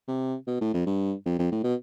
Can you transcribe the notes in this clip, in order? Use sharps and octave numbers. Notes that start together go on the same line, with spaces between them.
C3
B2
A2
F2
G2
F2
F2
A2
B2